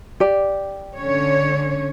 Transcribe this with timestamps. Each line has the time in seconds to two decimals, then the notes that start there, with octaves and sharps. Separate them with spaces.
0.20 G4 D5
0.97 D3 C#4 C#5